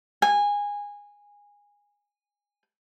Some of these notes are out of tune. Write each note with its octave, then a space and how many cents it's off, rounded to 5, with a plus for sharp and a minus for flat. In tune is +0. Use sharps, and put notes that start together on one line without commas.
G#5 -20